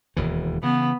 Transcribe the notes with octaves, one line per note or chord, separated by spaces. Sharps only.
E1 D#2 E3
C#3 E3 B3